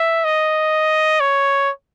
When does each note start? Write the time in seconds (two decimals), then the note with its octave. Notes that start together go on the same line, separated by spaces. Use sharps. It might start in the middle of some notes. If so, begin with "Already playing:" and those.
Already playing: E5
0.25 D#5
1.20 C#5